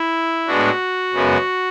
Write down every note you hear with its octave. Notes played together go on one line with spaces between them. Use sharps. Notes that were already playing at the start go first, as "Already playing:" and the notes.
Already playing: E4
A2 G#3 B3 D4 F#4
F#2 C#3 G#3 B3